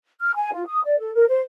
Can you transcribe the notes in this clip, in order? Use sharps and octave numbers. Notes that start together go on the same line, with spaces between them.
F6
G#5
F4
D#6
D5
A4
A#4
C5